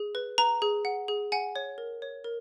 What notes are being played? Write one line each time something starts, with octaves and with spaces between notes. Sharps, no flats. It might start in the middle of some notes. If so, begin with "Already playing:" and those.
Already playing: G#4
B4
B4 A#5
G#4
F#5
G#4
F#5 G#5
C#5
A#4
C#5
A#4